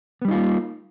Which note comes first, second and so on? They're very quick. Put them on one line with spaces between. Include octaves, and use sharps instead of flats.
B3 G3 D#4 F4 A#3